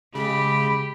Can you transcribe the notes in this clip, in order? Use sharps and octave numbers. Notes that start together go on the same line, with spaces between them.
C#3 G#3 G4 B5